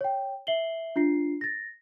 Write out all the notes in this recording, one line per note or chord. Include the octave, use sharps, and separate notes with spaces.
C#5 G5
E5 C7 F#7 G7
D4 F4 C7
A6 A#6